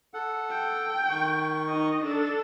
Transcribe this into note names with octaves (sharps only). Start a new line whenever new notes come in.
A4 F#5
G5
D#3 C#6
D#4 D#5
D4 A4